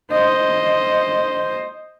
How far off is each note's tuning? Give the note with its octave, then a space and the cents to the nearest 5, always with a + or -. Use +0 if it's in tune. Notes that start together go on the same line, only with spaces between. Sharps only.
C5 +0 D#5 +0